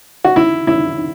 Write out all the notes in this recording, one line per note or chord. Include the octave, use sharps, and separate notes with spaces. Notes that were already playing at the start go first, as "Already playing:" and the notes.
F#4
E4
E4